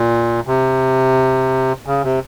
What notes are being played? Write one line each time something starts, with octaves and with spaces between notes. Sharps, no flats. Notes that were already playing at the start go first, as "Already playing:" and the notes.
Already playing: A#2
C3
C#3
C3